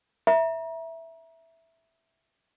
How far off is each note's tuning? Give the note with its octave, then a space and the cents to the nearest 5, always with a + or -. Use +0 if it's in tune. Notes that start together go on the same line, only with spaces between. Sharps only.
E5 +0 A#5 +30